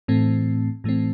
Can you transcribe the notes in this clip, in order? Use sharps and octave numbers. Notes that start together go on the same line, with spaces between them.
A2 E3 A3 C4
A2 E3 A3 C4